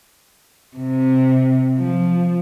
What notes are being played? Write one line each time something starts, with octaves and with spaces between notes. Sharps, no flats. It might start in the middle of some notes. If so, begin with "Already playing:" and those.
C3
F3